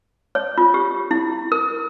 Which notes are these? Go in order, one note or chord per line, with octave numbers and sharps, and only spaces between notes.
C#5
F4
G4
E4
A#4